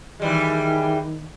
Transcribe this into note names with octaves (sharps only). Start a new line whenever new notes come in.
D#3 E3 G3 G#3